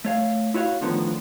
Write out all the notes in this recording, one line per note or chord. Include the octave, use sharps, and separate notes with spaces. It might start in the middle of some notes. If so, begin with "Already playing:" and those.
A3 C#5 F5
E4 F#4 C#5 D#5 F5
D2 A2 D3 D#3 F3 B3